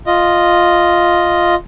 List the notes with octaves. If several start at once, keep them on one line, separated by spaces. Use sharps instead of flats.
F4 D#5